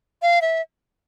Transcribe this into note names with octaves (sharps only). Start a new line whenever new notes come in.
F5
E5